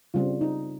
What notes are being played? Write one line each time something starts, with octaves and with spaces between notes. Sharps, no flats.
C#3 G3 C4 F4
D#4